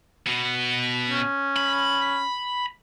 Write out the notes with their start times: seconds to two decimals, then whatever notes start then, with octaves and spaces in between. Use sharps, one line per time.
0.27 B2 B3
1.09 C#4
1.57 B5